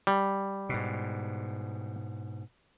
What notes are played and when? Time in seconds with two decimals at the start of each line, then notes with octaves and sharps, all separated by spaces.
0.07 G3
0.69 G#2 B2